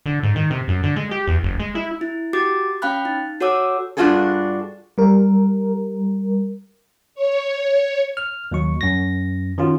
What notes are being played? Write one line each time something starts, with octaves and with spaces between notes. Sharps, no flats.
D3
G#2
D#3
C3
F#2
D3
G#3
G4
E2
F#1
G#3
E4
E4
F#4 G4 D6 A6
C#4 F5 G5 B5 F#6
D#4
F#4 A4 C#5 F#5 D6 E6
G2 D4 F4 F#4 G#4 A4
G3 A#4
C#5
F6
D#2 F#3 C#6
F#2 A#6
D#3 C#4 F4 F#4